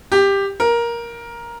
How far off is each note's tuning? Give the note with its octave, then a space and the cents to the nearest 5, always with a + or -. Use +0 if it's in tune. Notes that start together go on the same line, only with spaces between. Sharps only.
G4 +10
A#4 +10